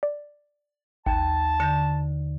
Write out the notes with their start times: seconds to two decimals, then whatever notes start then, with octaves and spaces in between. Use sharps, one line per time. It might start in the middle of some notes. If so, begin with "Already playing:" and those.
0.03 D5
1.06 A1 D#2 A5
1.60 D3 G6 A#6 C#7